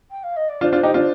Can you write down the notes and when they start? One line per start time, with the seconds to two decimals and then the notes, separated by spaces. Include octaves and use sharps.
0.11 G5
0.23 F5
0.36 D#5
0.49 D5
0.61 D4 F4 C5
0.72 D4 F4
0.83 D#4 G4
0.94 D4 F4